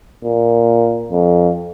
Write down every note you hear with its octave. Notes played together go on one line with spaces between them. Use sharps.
A#2
F2